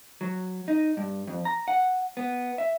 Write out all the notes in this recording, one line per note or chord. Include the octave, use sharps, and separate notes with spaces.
F#3
D#4
G2
F2
A#5
F#5
B3
E5